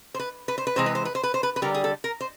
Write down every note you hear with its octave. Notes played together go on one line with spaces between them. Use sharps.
C5
B4
B4
C5
B4
C3 E3 G#3 C5
B4
C5
B4
C5
B4
C5
B4
B4
D3 G3 A#4
G#4
A4
A#4
C5